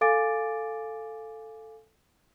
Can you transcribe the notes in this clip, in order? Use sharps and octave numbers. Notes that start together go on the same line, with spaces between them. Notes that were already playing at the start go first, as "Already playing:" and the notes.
A4 F5 G#5 D6 A6 D7